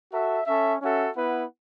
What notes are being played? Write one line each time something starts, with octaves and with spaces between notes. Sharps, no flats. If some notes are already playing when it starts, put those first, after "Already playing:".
F#4 A4 E5
C#4 A4 C#5 E5
C#4 F#4 A4 E5
B3 E4 B4 F#5